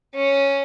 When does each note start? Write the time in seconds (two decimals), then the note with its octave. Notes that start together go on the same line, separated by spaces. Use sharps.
0.14 C#4